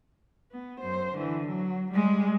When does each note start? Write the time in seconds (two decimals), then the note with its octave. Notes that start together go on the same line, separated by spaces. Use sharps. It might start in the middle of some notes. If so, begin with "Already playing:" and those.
0.51 B3
0.81 F#2 C5
1.15 D3 E3
1.47 F#3
1.91 G3 G#3